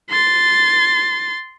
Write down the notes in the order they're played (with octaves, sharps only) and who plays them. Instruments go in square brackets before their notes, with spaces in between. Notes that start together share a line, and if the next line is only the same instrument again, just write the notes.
[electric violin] C6 A6